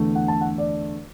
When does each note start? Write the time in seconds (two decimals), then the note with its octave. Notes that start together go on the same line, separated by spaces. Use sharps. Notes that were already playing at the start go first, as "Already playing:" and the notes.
Already playing: E2 D3 A3
0.15 F#5
0.28 A5
0.41 F#5
0.58 D5